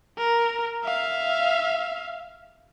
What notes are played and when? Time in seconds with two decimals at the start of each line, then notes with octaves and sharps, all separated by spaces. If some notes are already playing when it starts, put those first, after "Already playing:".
0.18 A#4
0.84 E5 F5